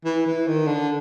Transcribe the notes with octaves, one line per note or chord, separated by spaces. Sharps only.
E3
E3
D#3
D3